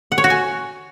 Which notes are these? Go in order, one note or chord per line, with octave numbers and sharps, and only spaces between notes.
F#5
C#5
F#4
G#5